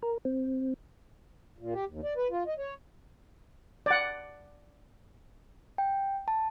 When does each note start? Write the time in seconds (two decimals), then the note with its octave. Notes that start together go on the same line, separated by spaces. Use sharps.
0.03 A#4
0.25 C4
1.58 A#2
1.74 G4
1.88 D#2
2.04 D5
2.17 B4
2.31 F4
2.47 D#5
2.58 C#5
3.86 D5 F#5
5.78 G5
6.28 A5